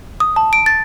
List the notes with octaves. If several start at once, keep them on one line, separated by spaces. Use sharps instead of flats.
D#6
A5
D7
A6